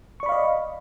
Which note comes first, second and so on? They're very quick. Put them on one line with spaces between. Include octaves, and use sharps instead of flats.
C#6 D5 B5 F5 D#5